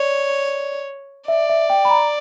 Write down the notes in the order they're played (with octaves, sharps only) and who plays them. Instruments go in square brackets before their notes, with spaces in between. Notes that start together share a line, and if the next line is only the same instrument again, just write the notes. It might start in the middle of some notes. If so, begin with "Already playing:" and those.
Already playing: [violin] C#5 [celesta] D5
[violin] D5 [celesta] E5
[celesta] E5
G5
B5
A#5